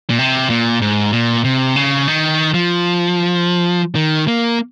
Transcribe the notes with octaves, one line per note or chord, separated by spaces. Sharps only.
A#2
C3
A#2
G#2
A#2
C3
C#3
D#3
F3
D#3
A#3